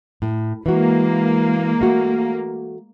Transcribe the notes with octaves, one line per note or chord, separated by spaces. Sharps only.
A2
E3 G#3 A#3 F#4
A3 F#4